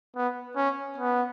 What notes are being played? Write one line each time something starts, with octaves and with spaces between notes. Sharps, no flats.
B3
C#4
B3